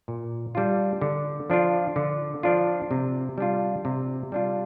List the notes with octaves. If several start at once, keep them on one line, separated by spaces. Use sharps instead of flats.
A#2
G3 D4 F4
D3
F3 D4 F4
D3
F3 D4 F4
C3
G3 D4 F4
C3
G3 D4 F4